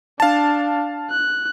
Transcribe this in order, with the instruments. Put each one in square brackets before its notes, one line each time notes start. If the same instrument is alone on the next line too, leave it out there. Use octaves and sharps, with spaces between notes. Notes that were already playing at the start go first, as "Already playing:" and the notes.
[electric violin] D4 [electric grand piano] F5 A5
[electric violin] F#6